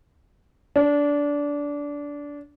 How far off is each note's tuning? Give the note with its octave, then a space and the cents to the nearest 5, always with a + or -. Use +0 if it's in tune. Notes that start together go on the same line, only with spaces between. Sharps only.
D4 -20